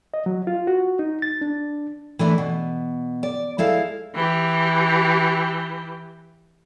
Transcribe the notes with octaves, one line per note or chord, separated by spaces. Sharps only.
D#5
F#3
F4
F#4
D#4
A6
D4
E3 A3 D4 E4
B2
D5
G#3 E4 A4 F5
E3 G4